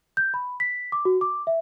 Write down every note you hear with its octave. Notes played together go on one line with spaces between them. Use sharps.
G6
B5
B6
D6
F#4
D6
E5